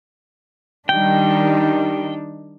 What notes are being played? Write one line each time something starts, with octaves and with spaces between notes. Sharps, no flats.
D#3 G3 D4 D#4 G5